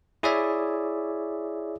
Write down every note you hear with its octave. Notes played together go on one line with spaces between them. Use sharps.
E4 G#4 C#5 D5 E5